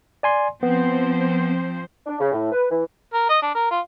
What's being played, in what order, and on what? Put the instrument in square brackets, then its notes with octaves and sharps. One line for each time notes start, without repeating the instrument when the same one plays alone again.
[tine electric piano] D5 G#5 C6
[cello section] F3 C4 C5 [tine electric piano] B3
[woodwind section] D4
C#3
A2
B4
E3
[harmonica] A#4
D#5
D4
A#4
F4